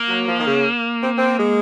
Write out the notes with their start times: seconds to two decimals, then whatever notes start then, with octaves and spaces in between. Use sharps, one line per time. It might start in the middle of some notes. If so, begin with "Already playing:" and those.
Already playing: A#3
0.09 F#3
0.27 F3
0.38 D#3
0.46 C#3
1.02 C4
1.17 C4
1.38 G#3